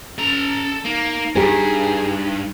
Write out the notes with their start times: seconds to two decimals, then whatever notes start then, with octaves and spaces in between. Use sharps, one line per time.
0.18 C#4 A4 A#5
0.85 A#3 D#4
1.35 G2 G4 G#4 A#4